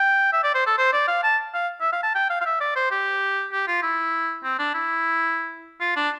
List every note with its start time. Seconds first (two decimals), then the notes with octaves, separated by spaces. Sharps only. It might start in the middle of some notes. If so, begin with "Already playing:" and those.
Already playing: G5
0.33 E5
0.43 D5
0.55 C5
0.67 A4
0.78 C5
0.93 D5
1.08 F5
1.23 A5
1.54 F5
1.81 E5
1.92 F5
2.03 A5
2.15 G5
2.30 F5
2.41 F5
2.46 E5
2.61 D5
2.76 C5
2.91 G4
3.52 G4
3.68 F4
3.83 E4
4.44 C4
4.59 D4
4.74 E4
5.81 F4
5.96 D4